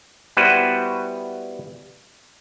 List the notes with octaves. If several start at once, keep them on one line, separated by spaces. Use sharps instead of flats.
G3 B3 E4 F#4 B4 C5